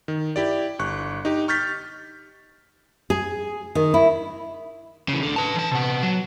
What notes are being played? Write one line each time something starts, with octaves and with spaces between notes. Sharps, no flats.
D#3
E4 G4 D5
G1 C#6 F#6
D#4 G4
C#6 F6 G6 A6 B6
G#4
D#3
E4
C#3 E3
D2 D3
B4 A5
E3 A5
C3 B3
F#3